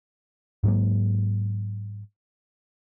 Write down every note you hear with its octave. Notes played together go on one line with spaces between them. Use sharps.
G#2 F#3 G#3 A#3